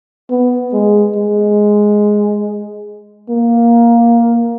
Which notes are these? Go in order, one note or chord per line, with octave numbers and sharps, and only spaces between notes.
B3
G#3
G#3
A#3